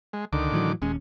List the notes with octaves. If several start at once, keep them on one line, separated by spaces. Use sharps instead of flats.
G#3
C#2 D3 D#3 D6
A2 E3 F#3
D#1 D#2 G#3 C#4